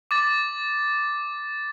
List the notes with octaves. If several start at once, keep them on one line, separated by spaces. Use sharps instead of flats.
D6 A6